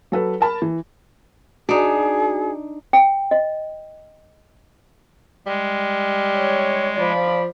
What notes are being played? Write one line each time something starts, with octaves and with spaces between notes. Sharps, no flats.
F#3 A4 B4
A#4 A5 B5
E3
D4 D#4 F#4 G#4
G5
D#5
G3 G#3
C#5
F3 D5 B5